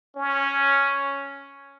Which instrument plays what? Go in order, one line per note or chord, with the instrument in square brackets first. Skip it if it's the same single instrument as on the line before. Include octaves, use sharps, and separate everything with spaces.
[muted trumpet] C#4